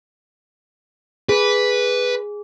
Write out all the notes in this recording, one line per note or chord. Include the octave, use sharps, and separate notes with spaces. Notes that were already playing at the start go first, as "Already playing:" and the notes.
G#4 B4